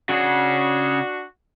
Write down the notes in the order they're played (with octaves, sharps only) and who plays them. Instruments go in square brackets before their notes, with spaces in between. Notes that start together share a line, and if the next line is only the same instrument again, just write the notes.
[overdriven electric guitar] C#3 G#4 [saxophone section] D4 F#4